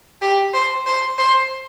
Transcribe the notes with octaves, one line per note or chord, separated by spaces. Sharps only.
G4
C5
C5
C5